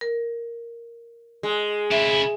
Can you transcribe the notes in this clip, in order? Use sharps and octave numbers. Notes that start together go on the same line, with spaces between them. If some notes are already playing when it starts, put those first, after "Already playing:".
A#4
G#3
C#3 E4 E5